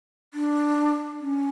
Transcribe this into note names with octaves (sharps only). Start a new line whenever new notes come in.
D4
C#4